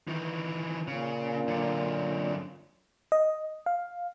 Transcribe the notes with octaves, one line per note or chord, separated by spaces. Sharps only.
D#3 E3
A#2 C#3
F#2 D3
D#5
F5